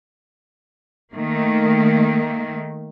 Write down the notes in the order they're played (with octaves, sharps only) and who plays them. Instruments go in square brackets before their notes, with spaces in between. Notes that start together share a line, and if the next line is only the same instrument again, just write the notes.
[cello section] D#3 A3 A#3